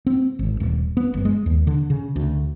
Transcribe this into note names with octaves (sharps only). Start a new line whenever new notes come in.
C4
G#1
D#1
B3
F#1
G#3
D#2
D3
C#3
D2